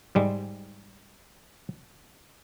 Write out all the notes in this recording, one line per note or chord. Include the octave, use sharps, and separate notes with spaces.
G#2 G3 G#3